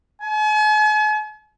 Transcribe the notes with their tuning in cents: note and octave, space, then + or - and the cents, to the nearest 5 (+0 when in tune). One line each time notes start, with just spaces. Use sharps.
G#5 +45